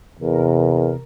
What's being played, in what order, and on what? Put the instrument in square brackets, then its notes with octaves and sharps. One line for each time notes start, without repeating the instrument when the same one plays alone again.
[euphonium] E2 [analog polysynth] C3 A#4